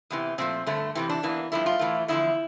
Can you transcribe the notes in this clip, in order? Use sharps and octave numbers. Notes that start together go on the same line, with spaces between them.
E2 C3 E3
A#2 F3 A3 C4
G2 D3 A3
E2 C3 E3 C4
D4
E2 E3 A#3
G2 F3 A3 E4
F4
A2 E3 A3
E2 D3 F3 E4